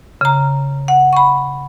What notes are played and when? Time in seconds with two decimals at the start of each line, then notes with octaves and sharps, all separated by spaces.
0.21 C#3 A#5
0.88 F#5
1.13 B5 C#6